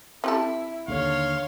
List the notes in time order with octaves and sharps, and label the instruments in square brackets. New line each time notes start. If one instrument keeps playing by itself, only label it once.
[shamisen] C4 G4 A4 [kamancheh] E4
[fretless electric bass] D#2 D3 [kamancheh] C#5 C6 [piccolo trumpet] F5